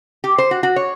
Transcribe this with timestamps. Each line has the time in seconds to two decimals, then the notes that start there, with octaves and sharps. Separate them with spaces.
0.24 G4
0.38 C5
0.51 F#4
0.63 F#4
0.76 C#5